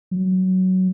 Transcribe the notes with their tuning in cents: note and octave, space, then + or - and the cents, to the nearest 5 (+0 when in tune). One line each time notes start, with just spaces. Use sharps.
F#3 +10